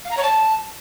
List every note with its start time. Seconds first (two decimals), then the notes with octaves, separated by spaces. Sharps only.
0.05 F5
0.11 A#5
0.17 C#5
0.23 A5